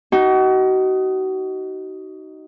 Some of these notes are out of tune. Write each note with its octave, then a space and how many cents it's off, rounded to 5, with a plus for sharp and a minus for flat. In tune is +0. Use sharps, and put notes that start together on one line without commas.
D#4 +5 F#4 +35